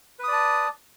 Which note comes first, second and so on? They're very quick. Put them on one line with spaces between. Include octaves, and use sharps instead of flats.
B4 D#6 D5 A5